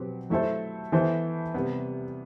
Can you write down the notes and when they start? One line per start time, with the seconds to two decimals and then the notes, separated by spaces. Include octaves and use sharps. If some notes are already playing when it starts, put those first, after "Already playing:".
Already playing: B2 F#3 C4 G4 B4
0.30 F#3 A3 E4 A4 C5
0.92 E3 B3 E4 A4 C5
1.54 C3 G3 B3